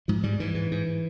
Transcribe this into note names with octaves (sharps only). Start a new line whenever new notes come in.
G#2 F3
G#2 G3
G#2 E3
G#2
G#2